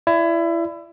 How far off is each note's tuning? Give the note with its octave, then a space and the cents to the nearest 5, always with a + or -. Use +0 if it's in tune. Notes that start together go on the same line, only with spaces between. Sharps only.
E4 +25 D5 +0